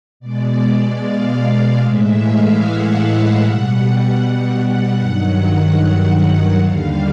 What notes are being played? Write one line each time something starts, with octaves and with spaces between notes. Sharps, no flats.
B2 G#3 D5
F5
A2 E3 G#3 E5
F5
F#5
B2 G3 F#5
F#5
G2 D#3 F#3 F#5
D#2 D3 G3 F5